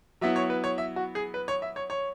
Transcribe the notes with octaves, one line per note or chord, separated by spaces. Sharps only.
F#3 B3 E4 E5
C#5
B4
C#5
E5
F#4
G#4
B4
C#5
E5
C#5
C#5